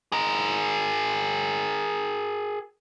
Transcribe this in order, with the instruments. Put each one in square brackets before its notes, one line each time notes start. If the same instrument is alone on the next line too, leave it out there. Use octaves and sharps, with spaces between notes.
[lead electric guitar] G#4 A#4